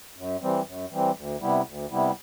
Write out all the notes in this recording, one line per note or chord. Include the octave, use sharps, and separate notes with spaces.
F#2
E3 G3 C4
F#2
E3 G3 C4
D2
C3 G3 B3 E4
D2
C3 G3 B3 E4